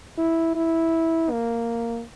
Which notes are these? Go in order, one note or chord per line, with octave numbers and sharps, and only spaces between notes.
E4
E4
A#3